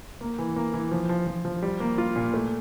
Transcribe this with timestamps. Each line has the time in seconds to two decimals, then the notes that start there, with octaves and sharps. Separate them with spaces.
0.21 A#3
0.39 E3
0.56 A#3
0.74 E3
0.91 F3
1.09 F3
1.27 F3
1.45 F3
1.63 G3
1.80 A#3
1.98 F4
2.16 A#2
2.34 A3